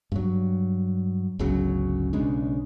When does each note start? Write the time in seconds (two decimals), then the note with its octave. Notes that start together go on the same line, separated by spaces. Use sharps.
0.12 G2 F#3
1.39 G1 C#2 C#3 F#3
2.13 B1 C#3 G#3 D4